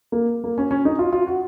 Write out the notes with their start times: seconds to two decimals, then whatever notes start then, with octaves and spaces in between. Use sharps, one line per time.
0.12 A#3
0.44 A#3
0.58 C#4
0.71 C#4
0.85 D#4
0.99 F4
1.13 F4
1.27 F#4